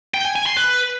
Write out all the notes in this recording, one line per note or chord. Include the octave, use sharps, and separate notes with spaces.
G5
G#5
G#5
C6
B4